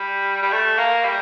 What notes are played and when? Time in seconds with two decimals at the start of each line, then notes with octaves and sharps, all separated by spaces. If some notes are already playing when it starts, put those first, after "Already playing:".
Already playing: G3
0.42 G3
0.52 A3
0.78 A#3
1.05 G3